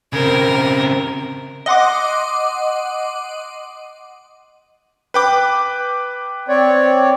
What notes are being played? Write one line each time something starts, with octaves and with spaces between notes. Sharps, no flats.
C#3 C4 A#4
D#5 F#5 C6 D6
B4 G5 D6
C4 C#5 D5